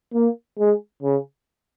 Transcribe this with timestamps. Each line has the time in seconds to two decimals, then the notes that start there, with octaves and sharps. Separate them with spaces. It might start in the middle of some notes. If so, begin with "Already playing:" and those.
0.14 A#3
0.58 G#3
1.03 C#3